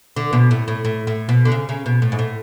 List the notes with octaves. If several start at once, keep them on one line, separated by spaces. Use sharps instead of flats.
D3
B2
A2
A2
A2
A2
B2
D3
C#3
C#3
B2
A2
G#2
A2